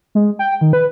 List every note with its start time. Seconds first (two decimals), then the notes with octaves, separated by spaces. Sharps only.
0.15 G#3
0.39 G5
0.61 D#3
0.73 B4